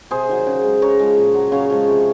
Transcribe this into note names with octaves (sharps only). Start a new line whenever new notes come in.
C3 G#4 C5
D#3 F#3
C#3
G#3
C#3 A#4 C#5
F3 G#3
A#2
F#3
C#3 C#5 F5
F3 G#3
C3